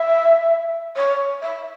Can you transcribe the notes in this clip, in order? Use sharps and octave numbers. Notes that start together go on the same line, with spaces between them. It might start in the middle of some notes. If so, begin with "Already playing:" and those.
Already playing: E5
C#5
E5